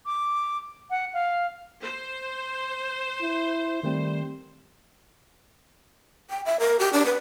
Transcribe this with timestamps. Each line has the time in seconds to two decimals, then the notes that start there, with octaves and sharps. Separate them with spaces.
0.06 D6
0.90 F#5
1.14 F5
1.82 C5
3.22 E4
3.83 D#3 G3 A3 C4
6.30 G5
6.46 E5
6.60 A#4
6.79 G4
6.93 D4
7.06 B4